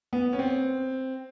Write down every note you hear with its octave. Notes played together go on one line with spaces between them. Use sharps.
B3
C#4
C4